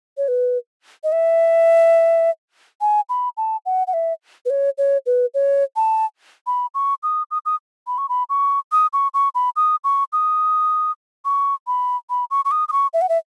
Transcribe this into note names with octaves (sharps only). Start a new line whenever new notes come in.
C#5
B4
D#5
E5
G#5
B5
A5
F#5
F#5
E5
B4
C#5
C#5
B4
C#5
A5
B5
C#6
D#6
D#6
D#6
B5
C#6
B5
C#6
D#6
C#6
C#6
B5
D#6
C#6
D#6
C#6
B5
B5
C#6
C#6
D#6
D#6
C#6
E5
F#5
E5